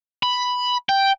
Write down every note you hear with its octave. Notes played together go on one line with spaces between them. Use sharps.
B5
G5